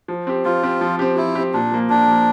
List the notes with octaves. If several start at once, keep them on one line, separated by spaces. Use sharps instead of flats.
F3
C4 G4
F3 F4
C4 G4
F3
C4 G4
F3 E4
C4 G4
A#2 D4
F3 A#3
A#2 D4
F3 A#3